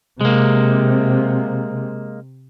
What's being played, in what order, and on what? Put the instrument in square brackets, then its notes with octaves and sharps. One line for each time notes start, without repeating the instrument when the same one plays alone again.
[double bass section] C3 [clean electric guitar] G#3 A#3